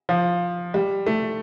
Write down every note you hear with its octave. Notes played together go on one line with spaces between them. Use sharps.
F3
G3
A3